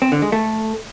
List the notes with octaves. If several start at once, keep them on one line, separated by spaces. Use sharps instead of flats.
C4
D3
G#3
A3